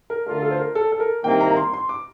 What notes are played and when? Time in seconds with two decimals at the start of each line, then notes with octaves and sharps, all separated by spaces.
0.10 A#4
0.27 D2 D3 A3 D4 F4 A#4
0.42 A4
0.51 C5
0.59 A#4
0.75 A4
0.92 A4
1.00 A#4
1.24 C2 C3 D#3 A#3 G5
1.40 A#5
1.51 A#5
1.57 C6
1.74 C6
1.89 D6